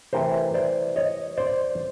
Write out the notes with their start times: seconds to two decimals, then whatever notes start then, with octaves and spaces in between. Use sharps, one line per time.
0.13 C3 E3 A3 A#4 C5
0.54 C5 D5
0.96 C#5 D#5
1.37 C5 D5